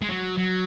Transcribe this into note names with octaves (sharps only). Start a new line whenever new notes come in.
G#3
F#3
F#3